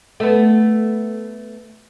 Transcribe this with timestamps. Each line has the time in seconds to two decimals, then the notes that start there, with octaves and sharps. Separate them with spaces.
0.20 A3 B3